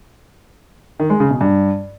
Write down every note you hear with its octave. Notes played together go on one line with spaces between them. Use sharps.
D#3
G#3
C#3
B2
G2